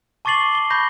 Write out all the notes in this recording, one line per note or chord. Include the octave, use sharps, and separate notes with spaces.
A5 C#6 D6 A6 C7 F#7
G7
B5 C#6 G6 A#6